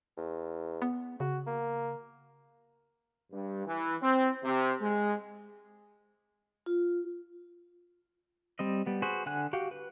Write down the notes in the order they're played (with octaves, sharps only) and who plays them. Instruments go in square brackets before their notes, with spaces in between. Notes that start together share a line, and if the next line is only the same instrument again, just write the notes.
[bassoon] E2
[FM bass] B3
[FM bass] C#3 [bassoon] F#4
[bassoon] A#3
[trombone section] G2
E3
C4
C3
G#3
[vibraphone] F4
[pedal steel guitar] G3 C4 D#5
G3 B3
F#4 G#4 B4 C5
D3 F#5 G#5 F#6
F#4 G4 F5
B4